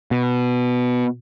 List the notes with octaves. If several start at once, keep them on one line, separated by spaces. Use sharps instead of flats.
B2